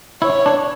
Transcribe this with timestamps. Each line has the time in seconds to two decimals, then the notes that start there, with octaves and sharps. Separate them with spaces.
0.22 E4 C#5
0.46 D4